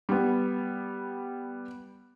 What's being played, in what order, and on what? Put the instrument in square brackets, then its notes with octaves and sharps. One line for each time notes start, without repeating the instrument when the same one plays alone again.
[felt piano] G3 B3